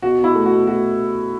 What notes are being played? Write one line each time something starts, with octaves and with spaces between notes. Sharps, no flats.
B2 F#4
B2
E4
A3
F#4
B2
A3 F#4